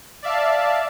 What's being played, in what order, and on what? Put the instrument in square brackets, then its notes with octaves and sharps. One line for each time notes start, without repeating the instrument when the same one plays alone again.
[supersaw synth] D5 E5 F5 A5